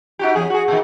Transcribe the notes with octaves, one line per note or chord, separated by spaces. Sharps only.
D#4 F#4 G4
E2 G#4
F#4 G#4
A#2 D#3